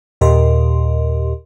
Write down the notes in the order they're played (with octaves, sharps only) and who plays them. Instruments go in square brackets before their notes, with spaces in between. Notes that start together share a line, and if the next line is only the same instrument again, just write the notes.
[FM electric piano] D#2 A#2 G4 A#4 D#5 C6